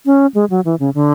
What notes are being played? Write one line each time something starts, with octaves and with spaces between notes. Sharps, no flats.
C#4
G#3
F#3
E3
C#3
D3